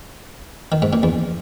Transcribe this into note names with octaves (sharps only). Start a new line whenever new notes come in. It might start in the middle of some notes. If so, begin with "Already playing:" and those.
D#3
G#2
A#2
E2